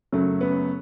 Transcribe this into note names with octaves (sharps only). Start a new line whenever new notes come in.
F#2 C#3 F#3 A3
B3